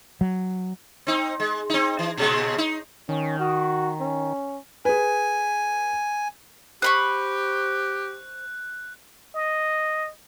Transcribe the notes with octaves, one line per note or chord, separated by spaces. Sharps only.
F#3
C4 D#4
G#3
C4 D#4
E3
A#2 C#3 G#3
D#4
D#3 C#4
F#4
C#4
G#4 B4 G#5
G4 C5 B5 C#6 F#6
D#5